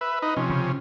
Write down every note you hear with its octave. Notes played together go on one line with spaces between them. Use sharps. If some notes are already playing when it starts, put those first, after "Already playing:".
B4 E5
D#4 B4 D#5
C3 F3 C#4
C#3